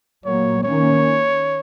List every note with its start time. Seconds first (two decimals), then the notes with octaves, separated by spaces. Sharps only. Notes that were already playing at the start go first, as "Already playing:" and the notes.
0.24 A#2 F#3 A#3 C#5
0.64 D#3 A#3 C#4 C#5